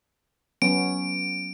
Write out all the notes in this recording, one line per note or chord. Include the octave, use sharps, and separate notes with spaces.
F#3 B3 C#4 D7